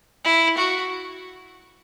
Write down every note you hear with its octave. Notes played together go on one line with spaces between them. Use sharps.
E4
F#4